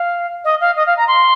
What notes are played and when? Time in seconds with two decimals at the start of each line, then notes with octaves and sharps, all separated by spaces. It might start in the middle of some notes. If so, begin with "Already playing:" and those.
Already playing: F5
0.44 D#5
0.60 F5
0.76 D#5
0.86 F5
0.97 A#5
1.07 C6